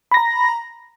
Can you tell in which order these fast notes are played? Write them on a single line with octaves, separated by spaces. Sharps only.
B5 A#6 A#5